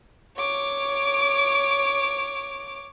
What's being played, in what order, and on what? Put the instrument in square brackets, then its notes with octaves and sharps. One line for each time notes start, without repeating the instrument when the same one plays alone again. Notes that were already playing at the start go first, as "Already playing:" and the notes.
[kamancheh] C#5 D6